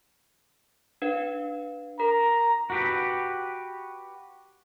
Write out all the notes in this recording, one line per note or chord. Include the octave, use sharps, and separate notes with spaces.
D4 B4 F5
A#4 A#5
F#4 G4 B4